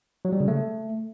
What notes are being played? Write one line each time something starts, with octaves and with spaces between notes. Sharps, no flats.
F#3
G3
C#3
A3